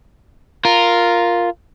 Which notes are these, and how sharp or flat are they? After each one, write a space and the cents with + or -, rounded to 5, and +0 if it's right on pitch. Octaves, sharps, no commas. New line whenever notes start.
F4 +0 A#4 +0